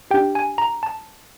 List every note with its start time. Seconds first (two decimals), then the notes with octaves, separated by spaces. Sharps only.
0.11 D4 G4 G5
0.35 G#5
0.58 A#5
0.83 A5